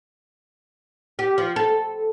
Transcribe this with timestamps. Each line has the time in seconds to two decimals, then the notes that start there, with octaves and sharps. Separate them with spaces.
1.19 G4
1.38 F3
1.56 A4